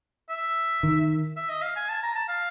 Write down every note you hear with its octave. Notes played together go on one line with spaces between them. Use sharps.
E5
D#3
E5
D#5
F5
G#5
A5
A#5
A5
F5